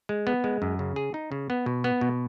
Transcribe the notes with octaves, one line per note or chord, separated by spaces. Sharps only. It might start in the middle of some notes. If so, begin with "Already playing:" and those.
G#3
B3
G#3
F#2
C#3
G#4
D#4
C#3
B3
B2
B3
B2